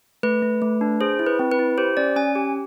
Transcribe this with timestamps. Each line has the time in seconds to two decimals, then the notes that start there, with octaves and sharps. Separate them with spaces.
0.23 A3 B4
0.43 A3
0.62 A3
0.81 D4
1.01 G#4 C5
1.19 E4
1.26 B4
1.39 C4
1.51 B4
1.59 E4
1.78 G4 C5
1.97 C#4 D5
2.16 C#4 G#5
2.35 G4